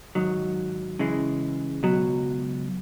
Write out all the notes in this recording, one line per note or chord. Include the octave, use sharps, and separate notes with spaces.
G#2 D#3 F#3
C#3 E3 G#3
C#2 B2 F#3